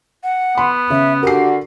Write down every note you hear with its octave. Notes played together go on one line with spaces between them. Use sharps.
F#5
B3 B5 C6
C#3 E5
D3 D4 F#4 G4 A#4 C7